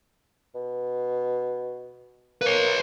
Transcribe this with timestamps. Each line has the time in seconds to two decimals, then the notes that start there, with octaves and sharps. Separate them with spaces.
0.55 B2
2.41 A#3 B4 C#5